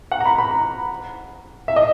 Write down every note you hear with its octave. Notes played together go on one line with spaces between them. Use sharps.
F#5
A#5
B5
B5
A#5
E5
D#5